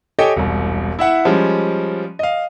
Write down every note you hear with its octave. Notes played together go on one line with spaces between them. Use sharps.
G4 A4 C#5 D#5 G5 G#5
E1 C2
E4 E5 F#5
F3 G3 G#3 C#4
D#5 F5